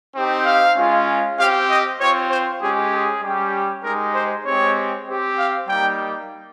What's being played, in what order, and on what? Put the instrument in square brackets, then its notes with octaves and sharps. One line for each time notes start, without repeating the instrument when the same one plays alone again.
[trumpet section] C4 D#4 G4
F5
G#3 C#4 F4
C4 G4 F5
D#5
C4 F4 C#5
C5
G#3 C#4 G4 G#4
G#4
G3 C#4 G4
G#3 D#4 G4 A#4
C5
G#3 C4 G4 C#5
C4 G4
F5
G3 A#3 D#4 G5